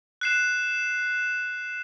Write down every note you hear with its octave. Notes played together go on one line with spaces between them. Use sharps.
F#6 C7 E7